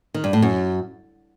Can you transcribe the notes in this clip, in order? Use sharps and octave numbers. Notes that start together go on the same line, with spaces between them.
D#3
G2
A2
F#2